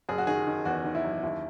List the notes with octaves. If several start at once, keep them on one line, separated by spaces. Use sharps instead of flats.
F#1 G#4
F#4
D#3 G#4
D#3
E2 F#4
D#3
E4
F#1
D#2 E4